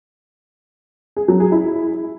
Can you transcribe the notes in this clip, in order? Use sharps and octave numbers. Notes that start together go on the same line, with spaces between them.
G#4
F#3
G#4
E4